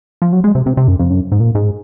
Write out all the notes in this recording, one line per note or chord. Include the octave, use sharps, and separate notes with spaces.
F3
F#3
G#3
C3
C3
C3
F#2
F2
F#2
G#2
A#2
G#2